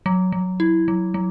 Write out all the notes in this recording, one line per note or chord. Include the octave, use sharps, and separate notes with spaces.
F#3
F#3
E4
F#3
F#3